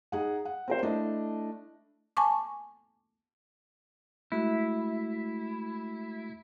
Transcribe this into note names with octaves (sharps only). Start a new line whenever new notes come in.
D#4 G#4 F#5
F#5
C4 A#4 C5
A3 D4 E4 D#5
G#5 A5 C#6 D6
G#3 A3 E4 F#4